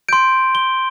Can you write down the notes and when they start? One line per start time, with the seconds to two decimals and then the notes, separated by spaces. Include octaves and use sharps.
0.09 C6 G6 D7
0.55 G7